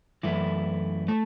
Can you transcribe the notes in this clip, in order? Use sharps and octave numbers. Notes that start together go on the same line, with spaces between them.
F#2 E3 A3 E4
A3